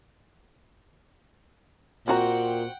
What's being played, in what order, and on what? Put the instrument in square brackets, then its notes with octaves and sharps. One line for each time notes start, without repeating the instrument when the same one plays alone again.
[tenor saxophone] A#2 [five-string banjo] C4 F#4 A#5 [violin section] F#5 G5